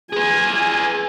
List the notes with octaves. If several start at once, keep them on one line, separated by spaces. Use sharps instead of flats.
G#4 B4 G#5